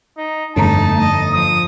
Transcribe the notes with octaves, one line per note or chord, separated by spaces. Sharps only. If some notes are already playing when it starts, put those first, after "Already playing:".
D#4
G1 F2 A3 D#4 A5 A#5
D#5
F3 D#6